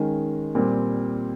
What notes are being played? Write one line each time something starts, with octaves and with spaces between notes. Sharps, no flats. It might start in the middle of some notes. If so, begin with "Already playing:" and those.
Already playing: D#3 G#3 C#4
A#2 G3 C4